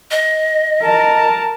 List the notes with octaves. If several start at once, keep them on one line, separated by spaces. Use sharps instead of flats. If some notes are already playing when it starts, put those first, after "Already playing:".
D#5
A#4 A5